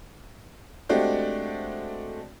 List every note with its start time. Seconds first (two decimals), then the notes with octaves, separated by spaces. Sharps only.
0.89 G#3 A3 C4 D4 F#4 G4